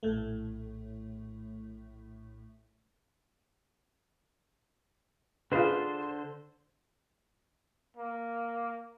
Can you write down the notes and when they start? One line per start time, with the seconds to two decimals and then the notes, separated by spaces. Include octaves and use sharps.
0.03 A#1 A2 A3
5.52 D3 F4 G#4 B4 C5
7.97 A#3